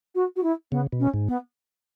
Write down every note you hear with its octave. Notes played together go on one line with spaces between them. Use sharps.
F#4
F#4
E4
C#3 B3
B2
C#4
G#2
B3